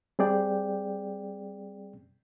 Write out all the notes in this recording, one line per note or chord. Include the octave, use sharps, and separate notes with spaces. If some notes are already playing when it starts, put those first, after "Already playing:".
G3 C4 G#4 D5 G5